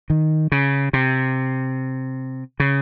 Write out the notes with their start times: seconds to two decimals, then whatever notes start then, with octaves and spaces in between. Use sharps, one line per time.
0.10 D#3
0.52 C#3
0.93 C3
2.60 C#3